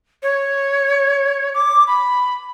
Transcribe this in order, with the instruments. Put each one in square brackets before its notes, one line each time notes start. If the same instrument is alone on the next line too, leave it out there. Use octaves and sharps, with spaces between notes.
[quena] C#5
D6
B5